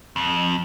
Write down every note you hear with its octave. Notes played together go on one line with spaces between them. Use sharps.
F2